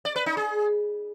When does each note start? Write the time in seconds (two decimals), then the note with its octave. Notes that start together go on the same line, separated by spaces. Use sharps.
0.05 D5
0.16 B4
0.26 D#4
0.37 G#4